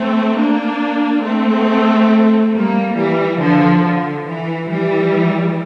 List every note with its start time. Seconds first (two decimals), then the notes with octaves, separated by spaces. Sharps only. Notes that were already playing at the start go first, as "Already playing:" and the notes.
Already playing: A3 C4
0.36 A#3 D4
1.23 A3 C4
2.53 G3 A#3
2.96 E3 G3
3.39 D3 F3
3.83 D3
4.26 E3
4.69 E3 G3